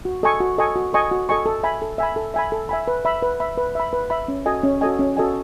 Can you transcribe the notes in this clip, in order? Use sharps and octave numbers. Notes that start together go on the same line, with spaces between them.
F#4
A4 D#5 G#5 C#6
F#4
A4 D#5 G#5 C#6
F#4
A4 D#5 G#5 C#6
F#4
A4 D#5 G#5 C#6
A4
E5 G#5 B5
A4
E5 G#5 B5
A4
E5 G#5 B5
A4
E5 G#5 B5
B4
E5 B5
B4
E5 B5
B4
E5 B5
B4
E5 B5
C#4
F#4 A4 D#5 G#5
C#4
F#4 A4 D#5 G#5
C#4
F#4 A4 D#5 G#5